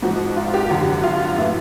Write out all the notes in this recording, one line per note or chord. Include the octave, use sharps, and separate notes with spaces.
G#2 F3 F#4
F4
G4
F#2 D3 F#3 F#4
F#4
F4
A2 E3 E4